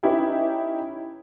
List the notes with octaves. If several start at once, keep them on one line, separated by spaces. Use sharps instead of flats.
C#4 D#4 E4 G4 B4 G5